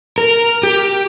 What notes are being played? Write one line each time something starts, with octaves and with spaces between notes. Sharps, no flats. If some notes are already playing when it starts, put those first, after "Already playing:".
A#4
G4